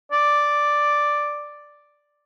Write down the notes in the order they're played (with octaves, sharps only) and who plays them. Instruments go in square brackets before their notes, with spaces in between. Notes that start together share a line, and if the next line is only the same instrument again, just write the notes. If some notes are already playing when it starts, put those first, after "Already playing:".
[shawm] D5